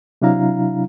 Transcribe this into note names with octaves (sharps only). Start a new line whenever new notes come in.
C3 F#3 D4 E4 F5 A#5